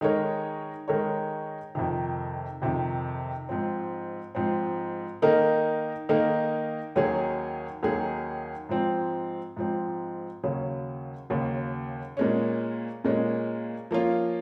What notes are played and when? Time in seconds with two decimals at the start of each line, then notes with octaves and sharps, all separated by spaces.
0.01 D#3 G#3 D#4 A#4 C#5
0.88 D#3 G#3 D#4 A#4 C#5
1.75 F2 C3 D#3
2.62 F2 C3 D#3
3.49 G#2 F3 C4
4.35 G#2 F3 C4
5.22 D#3 A#3 D#4 A#4
6.09 D#3 A#3 D#4 A#4
6.95 D#2 D#3 F#3 C#4 G#4
7.83 D#2 D#3 F#3 C#4 G#4
8.69 G#2 F3 C4
9.57 G#2 F3 C4
10.43 D#2 C#3 F#3 C#4
11.30 D#2 C#3 F#3 C#4
12.17 A#2 G#3 C#4
13.04 A#2 G#3 C#4
13.91 F3 A#3 C#4 F4